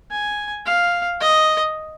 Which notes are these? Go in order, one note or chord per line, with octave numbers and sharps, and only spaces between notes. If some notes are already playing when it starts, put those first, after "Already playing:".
G#5
F5
D#5